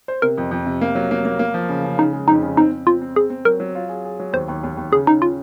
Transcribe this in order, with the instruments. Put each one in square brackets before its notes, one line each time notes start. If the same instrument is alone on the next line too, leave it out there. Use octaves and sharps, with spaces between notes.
[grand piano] C5
[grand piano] C3 [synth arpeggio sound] A#4
[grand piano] F2
F2
C3
A#3
F#3
A#3
A#3
A#3
F3
C#3
C#3
[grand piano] C#3 [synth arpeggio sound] D#4
[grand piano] G#3
[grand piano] F2 [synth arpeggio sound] D#4
[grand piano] C#3
[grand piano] C4 [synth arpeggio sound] D#4
[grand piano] C4
[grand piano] C4 [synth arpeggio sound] F4
[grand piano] C4
[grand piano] C4 [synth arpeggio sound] G#4
[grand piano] C4
[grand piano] F#3 [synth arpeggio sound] A#4
[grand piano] F#3
F4
G#4
G#4
F#3
[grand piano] D#2 [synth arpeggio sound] C5
[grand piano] D#2
D#2
D#2
[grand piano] C#3 [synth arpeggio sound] G#4
[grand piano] C#3 [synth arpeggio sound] D#4
[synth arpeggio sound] F4